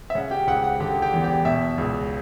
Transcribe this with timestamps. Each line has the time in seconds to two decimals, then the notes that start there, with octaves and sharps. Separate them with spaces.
0.10 E5
0.15 C#3 F#5
0.31 G4 G5
0.47 C#2 F#5
0.64 F#5
0.80 D3 G4 G5
1.02 G4 G5
1.13 E2
1.23 G4 G5
1.45 B2 E5
1.78 C#2